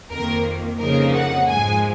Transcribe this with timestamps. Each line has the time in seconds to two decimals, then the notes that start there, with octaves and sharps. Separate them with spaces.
0.10 F2 D#3 A#3 A#4
0.79 F2 C#3 F3 A#3 D#4 A#4
1.14 F#5
1.48 G#2 F3 G#3 G#5